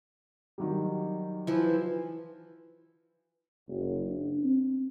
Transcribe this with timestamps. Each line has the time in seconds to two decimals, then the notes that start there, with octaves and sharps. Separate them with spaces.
0.58 D#3 F#3 G3
1.47 E3 F3
3.68 F#1
4.06 D4
4.44 C4